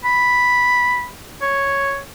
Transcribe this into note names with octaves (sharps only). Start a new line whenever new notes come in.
B5
C#5